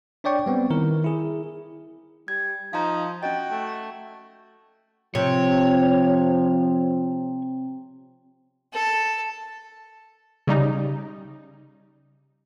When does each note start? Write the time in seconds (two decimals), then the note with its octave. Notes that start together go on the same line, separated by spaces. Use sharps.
0.24 D4 C#5 D5 G5 C#6
0.46 G3 B3 C4
0.70 D#3 E4 A#4
1.04 E4 G#4
2.28 G3 G#6
2.73 F3 D#4 F5 A#5
3.23 C#4 F#4 D#5 G5
3.51 A3
5.15 C3 F3 C#5
8.73 A4
10.47 C#3 G3 D#4